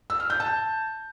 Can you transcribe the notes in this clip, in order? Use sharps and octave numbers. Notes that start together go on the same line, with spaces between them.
E6
F6
G6
A5